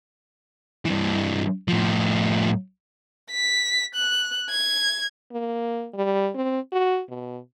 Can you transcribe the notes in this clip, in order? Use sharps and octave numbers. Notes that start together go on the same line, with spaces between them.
G2 E3
A2 F3
B6
F#6
G#6
A#3
G3
C4
F#4
B2